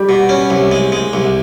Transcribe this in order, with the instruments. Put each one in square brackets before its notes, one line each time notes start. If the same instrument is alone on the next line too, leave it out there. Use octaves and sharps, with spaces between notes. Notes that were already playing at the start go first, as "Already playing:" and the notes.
Already playing: [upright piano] G3 G4
[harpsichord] B2
C#4
C2
G#3
G#3
C2